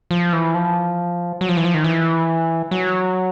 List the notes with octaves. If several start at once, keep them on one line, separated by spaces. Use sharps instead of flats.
F3
E3
F3
F#3
F3
E3
F3
D#3
E3
F#3